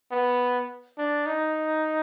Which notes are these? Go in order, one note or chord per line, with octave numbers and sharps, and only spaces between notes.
B3
D4
D#4